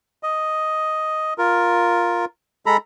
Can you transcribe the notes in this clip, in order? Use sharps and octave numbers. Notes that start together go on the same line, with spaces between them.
D#5
F4 A#4
G#3 A4 A#5 B5